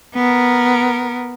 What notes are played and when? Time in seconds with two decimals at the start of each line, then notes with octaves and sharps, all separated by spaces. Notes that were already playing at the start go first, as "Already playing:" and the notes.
0.15 B3 A#4